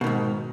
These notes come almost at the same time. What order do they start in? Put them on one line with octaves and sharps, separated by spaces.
B2 D#3 G#2